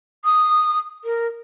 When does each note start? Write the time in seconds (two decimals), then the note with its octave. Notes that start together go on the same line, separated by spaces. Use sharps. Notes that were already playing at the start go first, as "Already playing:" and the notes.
0.25 D#6
1.04 A#4